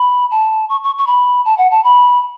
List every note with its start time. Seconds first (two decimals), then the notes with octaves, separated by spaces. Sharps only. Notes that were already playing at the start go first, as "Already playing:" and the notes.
Already playing: B5
0.31 A5
0.70 C#6
0.84 C#6
0.98 C#6
1.07 B5
1.45 A5
1.58 F#5
1.71 A5
1.84 B5